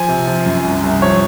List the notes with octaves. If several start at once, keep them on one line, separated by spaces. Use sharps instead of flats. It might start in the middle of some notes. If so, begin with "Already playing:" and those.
Already playing: F3 G#5
C3
F3
F#2
C2
C2
F3 C#5